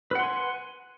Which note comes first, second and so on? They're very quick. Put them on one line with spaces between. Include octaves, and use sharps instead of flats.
B4 F#5 C6 G#5